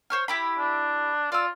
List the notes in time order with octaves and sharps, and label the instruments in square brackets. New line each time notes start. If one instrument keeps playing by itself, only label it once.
[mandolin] C5 C#5 F6
E4 G4 B5
[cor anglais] D4
[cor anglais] F4 [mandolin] D5 E6